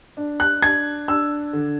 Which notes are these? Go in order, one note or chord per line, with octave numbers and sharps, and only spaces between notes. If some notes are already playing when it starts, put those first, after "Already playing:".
D4
F#6
D4 G#6
D4 E6
D3